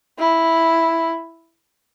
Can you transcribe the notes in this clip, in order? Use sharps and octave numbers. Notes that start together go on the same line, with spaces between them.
E4